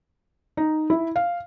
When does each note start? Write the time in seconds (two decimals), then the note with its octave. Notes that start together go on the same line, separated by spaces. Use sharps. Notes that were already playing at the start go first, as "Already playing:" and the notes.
0.57 D#4
0.90 E4
1.16 F5